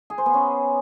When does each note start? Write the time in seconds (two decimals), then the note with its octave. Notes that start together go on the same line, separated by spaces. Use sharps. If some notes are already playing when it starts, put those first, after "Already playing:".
0.10 G#4
0.18 C5
0.26 B3
0.34 C#4